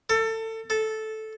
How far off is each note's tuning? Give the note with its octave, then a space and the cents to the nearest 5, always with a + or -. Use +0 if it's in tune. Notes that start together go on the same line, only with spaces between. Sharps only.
A4 +25
A4 -10